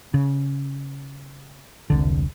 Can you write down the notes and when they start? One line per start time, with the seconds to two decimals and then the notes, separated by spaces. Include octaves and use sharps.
0.14 C#3
1.90 E1 C2 D3